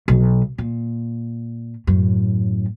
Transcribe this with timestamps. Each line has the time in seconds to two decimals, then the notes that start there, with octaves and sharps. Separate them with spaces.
0.08 B1
0.58 A#2
1.87 F#2 A2